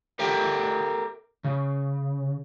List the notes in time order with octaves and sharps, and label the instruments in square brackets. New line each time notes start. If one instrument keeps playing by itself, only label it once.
[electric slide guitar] G4 A4 A#4 E5 G5
C#3